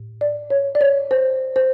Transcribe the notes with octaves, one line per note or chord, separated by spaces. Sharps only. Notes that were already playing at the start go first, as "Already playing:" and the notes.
Already playing: A2
D5
C#5
D5
C#5
C5
C5